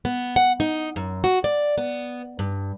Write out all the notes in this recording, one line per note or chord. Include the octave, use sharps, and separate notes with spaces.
B3
F#5
D#4
F#2
F#4
D5
B3
G2